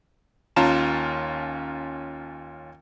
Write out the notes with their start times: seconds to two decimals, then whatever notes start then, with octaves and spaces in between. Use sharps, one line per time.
0.56 D#2 C#4 F4 A5 A#5 E7